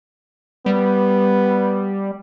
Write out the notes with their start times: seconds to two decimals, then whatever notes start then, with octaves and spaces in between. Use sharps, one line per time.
0.66 G3 B3